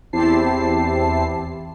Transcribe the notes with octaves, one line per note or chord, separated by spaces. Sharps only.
E2 C4 E4 G4 A5 C7